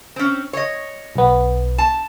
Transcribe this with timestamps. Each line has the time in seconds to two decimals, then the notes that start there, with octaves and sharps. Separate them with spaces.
0.16 C4 C#4
0.53 C#5 D#5
1.16 B1 B3
1.78 A5